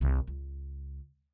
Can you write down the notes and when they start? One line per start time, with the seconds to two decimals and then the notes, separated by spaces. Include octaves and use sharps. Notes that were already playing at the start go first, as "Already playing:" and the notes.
0.01 C2 C3
0.27 C#2